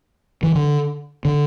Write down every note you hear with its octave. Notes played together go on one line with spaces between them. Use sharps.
E3
D3
D3